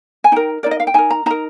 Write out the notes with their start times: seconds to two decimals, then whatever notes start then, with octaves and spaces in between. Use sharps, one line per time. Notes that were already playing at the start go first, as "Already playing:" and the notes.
0.24 G#5
0.32 D#4 A#4 G5
0.63 D#4 A#4 D5
0.71 D#5
0.80 F5
0.87 G5
0.94 D#4 A#4 G#5
1.10 A#5
1.26 D#4 A#4 A#5